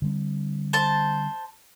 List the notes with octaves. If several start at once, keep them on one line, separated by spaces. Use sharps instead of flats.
D3 G3 C4
C5 A5